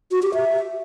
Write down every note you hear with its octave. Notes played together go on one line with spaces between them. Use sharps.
F#4
G4
E5